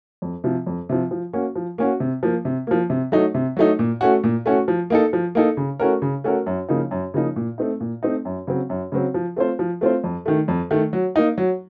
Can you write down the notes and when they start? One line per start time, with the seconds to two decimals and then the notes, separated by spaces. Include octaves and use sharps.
0.22 F2
0.44 C3 F3
0.67 F2
0.89 C3 F3
1.11 F3
1.33 A#3 C#4 F#4
1.55 F3
1.78 A#3 C#4 F#4
2.00 C3
2.23 F3 A#3
2.45 C3
2.67 F3 A#3
2.90 C3
3.12 F#3 A3 D#4
3.34 C3
3.57 F#3 A3 D#4
3.79 A#2
4.01 A3 C#4 F#4
4.24 A#2
4.46 A3 C#4 F#4
4.68 F3
4.90 A#3 D#4 A4
5.13 F3
5.35 A#3 D#4 A4
5.57 C#3
5.80 A3 C#4 F#4 A#4
6.02 C#3
6.24 A3 C#4 F#4 A#4
6.46 F#2
6.69 C#3 F3 A#3 D#4
6.91 F#2
7.14 C#3 F3 A#3 D#4
7.36 A#2
7.58 A3 C4 D#4
7.80 A#2
8.03 A3 C4 D#4
8.25 F#2
8.47 C#3 F#3 C4
8.70 F#2
8.92 C#3 F#3 C4
9.14 F3
9.36 A3 C4 F4 C5
9.59 F3
9.81 A3 C4 F4 C5
10.04 F2
10.26 D#3 A3
10.48 F2
10.71 D#3 A3
10.93 F#3
11.16 A#3 D#4
11.38 F#3